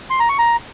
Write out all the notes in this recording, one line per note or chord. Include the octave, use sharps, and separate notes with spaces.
C6
A#5
C#6
A#5